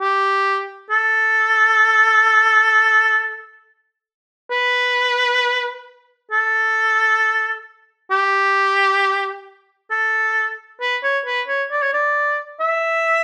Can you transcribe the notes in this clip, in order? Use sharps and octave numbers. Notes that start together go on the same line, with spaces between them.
G4
A4
B4
A4
G4
A4
B4
C#5
B4
C#5
D5
C#5
D5
E5